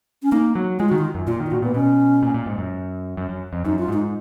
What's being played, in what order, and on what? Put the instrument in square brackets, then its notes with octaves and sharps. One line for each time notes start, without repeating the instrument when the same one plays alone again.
[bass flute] C#4
[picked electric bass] A#3 [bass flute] D#4
[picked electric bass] F#3
[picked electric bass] G#3 [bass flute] F4
[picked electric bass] D#3 [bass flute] F#4
[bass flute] F4
[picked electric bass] F#2
[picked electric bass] A#2 [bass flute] F4
[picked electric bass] D#3
[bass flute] F4
[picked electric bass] A#2 [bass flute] F#4
[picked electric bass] A#2 [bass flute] B3
[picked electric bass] B2 [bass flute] C#4
[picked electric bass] A#2
A#2
G#2
F#2
F#2
F#2
F2
[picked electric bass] F#2 [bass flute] D#4
[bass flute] F4
[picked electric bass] G#2 [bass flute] D#4